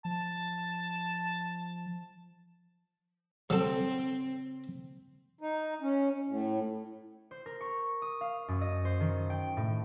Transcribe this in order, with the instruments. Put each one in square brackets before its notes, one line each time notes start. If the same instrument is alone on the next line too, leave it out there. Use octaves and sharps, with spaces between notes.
[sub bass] F3 [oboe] A5
[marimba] C#3 [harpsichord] F#3 A4 [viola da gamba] C4
[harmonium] D#4
C#4
A2
[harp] C5
A#4
C#6
D#6
F5
F#2
D#5
C5
D#3
G5
A2